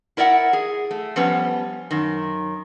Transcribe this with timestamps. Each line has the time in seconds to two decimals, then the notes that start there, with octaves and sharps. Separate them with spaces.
0.17 E4 A#4 D5 E5 F#5
0.53 G#4
0.91 A3
1.16 F3 G3 B3 C#4
1.91 F#2 D#3